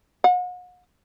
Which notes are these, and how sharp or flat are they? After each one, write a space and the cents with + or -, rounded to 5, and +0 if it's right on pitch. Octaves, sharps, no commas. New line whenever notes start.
F#5 -40